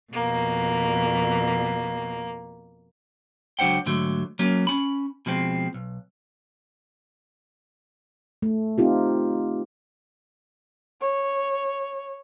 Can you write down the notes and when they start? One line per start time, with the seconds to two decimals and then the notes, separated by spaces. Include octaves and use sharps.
0.13 F2 B2 A#3
3.59 C#2 F#3 D4 C5 F#5 G5
3.86 G#2 D3 F#3 A3
4.39 F#3 A#3 C#4
4.67 C#4 B5
5.26 B2 F3 G#3 B3 C4
5.74 B1
8.42 A3
8.78 C4 D#4 F4 G4
11.01 C#5